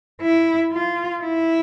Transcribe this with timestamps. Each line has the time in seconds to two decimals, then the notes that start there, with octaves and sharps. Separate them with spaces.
0.22 E4
0.72 F4
1.23 E4